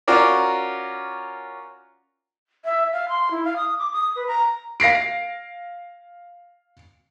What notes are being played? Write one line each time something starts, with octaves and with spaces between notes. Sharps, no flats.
C#4 F4 F#4 A#4 D5 A#5
E5
F5
C6
E4
F5
D#6
D6
D#6
B4
A#5
F5 A#6 C7 D7